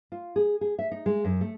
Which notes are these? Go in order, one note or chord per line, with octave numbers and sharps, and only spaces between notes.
F4
G#4
G#4
E5
D#4
G#3
F#2
A3